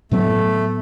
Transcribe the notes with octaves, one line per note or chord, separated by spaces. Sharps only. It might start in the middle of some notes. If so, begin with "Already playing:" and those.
A2 F#3 A3 B3